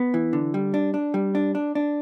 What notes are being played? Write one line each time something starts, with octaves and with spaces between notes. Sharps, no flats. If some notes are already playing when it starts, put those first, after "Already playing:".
Already playing: B3
E3
D3
G3
D4
D4
G3
D4
D4
D4